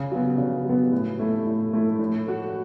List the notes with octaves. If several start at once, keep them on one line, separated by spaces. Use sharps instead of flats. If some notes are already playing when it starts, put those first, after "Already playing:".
Already playing: C#3
F#3 B3
C#3
F#3 B3
A2
A3 E4
A2
A3 E4
A2
A3 F#4